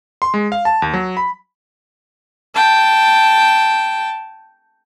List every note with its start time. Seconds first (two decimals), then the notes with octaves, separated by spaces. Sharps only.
0.22 C6
0.34 G#3
0.52 F5
0.65 A5
0.82 D#2
0.93 F#3
1.17 B5
2.55 G5 A5